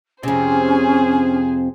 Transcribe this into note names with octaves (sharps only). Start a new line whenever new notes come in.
F2 C3 C#4 G#4 C5